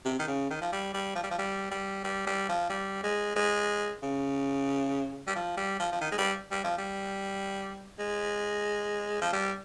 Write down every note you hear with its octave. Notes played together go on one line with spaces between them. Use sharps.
C3
D#3
C#3
D#3
F3
G3
G3
F3
G3
F3
G3
G3
G3
G3
F3
G3
G#3
G#3
C#3
G3
F3
G3
F3
F3
D#3
G#3
G3
G3
F3
G3
G#3
F3
G3